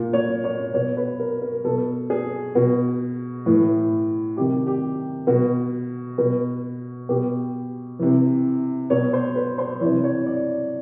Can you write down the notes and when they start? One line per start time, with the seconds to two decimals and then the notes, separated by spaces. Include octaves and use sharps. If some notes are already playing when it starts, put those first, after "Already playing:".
Already playing: A#2
0.13 C#5
0.44 C#5
0.74 B2 C#5
0.97 B4
1.20 A#4
1.42 A#4
1.65 B2 A4
2.10 G#4
2.55 B2 F#4
3.46 A2 E3
4.37 C3 D#3 G4
4.67 G4
5.27 B2 F#4
6.18 B2
7.09 B2 G4
7.99 C3 E3
8.90 B2 C#5
9.13 C5
9.36 B4
9.58 C5
9.81 C3 E3 C#5
10.04 C#5
10.26 D5